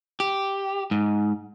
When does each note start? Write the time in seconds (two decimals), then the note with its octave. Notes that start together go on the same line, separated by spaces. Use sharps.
0.20 G4
0.91 G#2